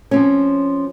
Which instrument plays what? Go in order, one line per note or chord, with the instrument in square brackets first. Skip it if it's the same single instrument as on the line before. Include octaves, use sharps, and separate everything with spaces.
[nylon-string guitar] F3 C4 C#4